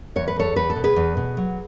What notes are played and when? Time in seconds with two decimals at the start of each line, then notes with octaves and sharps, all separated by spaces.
0.16 E2 C#5
0.28 B4
0.36 E2 A4 C#5
0.56 E2 B4
0.70 A4
0.76 B2
0.84 G#4 B4
0.96 E2
1.17 B2
1.37 F#3